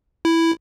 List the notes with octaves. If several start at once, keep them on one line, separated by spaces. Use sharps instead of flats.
E4